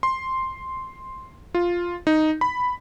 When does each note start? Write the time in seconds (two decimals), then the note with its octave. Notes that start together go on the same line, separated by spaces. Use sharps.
0.03 C6
1.55 F4
2.07 D#4
2.41 B5